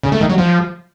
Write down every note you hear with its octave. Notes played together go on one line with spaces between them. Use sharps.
C#3
A3
D#3
F#3
F3